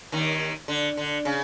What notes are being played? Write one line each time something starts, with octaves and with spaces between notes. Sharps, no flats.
D#2 D#3
D3
D3
C#3